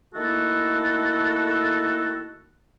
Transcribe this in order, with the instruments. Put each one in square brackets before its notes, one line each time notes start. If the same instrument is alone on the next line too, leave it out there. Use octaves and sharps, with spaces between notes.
[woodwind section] D#3 A3 A#3 E4 F#4 A4